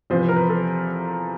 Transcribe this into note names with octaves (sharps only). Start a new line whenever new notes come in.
E2 C3 F3 C5
B4
A#4
B4
A4